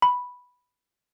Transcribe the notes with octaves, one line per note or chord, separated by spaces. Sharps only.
B5